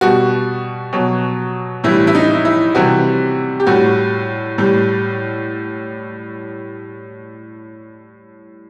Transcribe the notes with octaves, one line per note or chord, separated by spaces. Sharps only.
B2 G3 F#4
B2 F#3
A2 E3 G3 E4
E4
D#4
E4
C3 E3 G3 F#4
G4
A2 G3 F#4
A2 G3